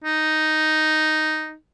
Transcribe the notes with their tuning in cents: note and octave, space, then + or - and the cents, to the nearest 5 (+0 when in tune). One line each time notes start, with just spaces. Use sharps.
D#4 +0